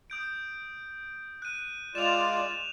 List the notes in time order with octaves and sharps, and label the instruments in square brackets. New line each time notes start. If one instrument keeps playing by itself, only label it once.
[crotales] D#6 G6 D7
F#6 D#7
[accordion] G#3 F4 D5 [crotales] E7 F7